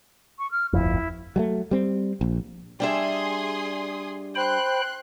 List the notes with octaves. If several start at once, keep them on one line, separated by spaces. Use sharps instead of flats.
C#6
F6
D1 G1 F2 E4
F#3 G3 A3
G3 C4
A#1
G3 D4 G#4 E5 C6 D#6
C5 G5 B5 C6 F#6